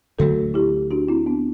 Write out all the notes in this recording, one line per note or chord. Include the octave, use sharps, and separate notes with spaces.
D2 D3 F#3 A3 F#4 A4
E4 G4
D4 F#4
C4 E4
B3 D4